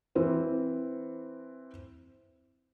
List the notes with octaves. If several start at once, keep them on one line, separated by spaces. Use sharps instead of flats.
E3 C4 C5